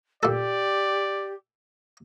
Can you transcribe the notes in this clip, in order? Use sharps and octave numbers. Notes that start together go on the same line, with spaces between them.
A#2 G4 A4 D5